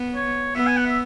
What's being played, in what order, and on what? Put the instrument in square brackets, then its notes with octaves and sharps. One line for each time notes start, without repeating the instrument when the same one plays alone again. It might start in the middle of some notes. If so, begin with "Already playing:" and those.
Already playing: [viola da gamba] B3
[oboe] C#5
[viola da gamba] B3 [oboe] E5
[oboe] G#5
F#5
E5